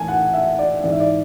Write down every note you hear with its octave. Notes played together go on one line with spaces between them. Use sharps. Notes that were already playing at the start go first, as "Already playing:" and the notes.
Already playing: A2 E3 G#5 A5
F#5
E5
D5
G#2 E3 D5
E5
D5